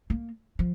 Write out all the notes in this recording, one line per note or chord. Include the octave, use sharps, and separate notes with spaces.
A#3
F3